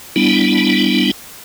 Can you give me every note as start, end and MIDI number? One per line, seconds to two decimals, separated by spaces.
0.16 1.11 55
0.16 1.11 59
0.16 1.11 62
0.16 1.11 64